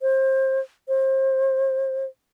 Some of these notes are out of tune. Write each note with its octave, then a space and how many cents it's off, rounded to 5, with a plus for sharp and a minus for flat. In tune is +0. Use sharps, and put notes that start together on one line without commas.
C5 +25
C5 +30